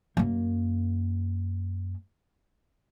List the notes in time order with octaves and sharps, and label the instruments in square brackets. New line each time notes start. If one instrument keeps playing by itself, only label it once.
[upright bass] F#2 A#3